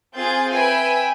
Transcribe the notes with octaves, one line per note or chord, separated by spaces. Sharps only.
C4 F4 G#4 G6 A6
B4 E5 G5 G#5